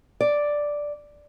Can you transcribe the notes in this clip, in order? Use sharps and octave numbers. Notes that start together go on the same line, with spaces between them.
D5